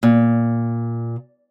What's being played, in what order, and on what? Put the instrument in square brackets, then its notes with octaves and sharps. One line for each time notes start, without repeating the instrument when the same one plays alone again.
[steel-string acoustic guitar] A#2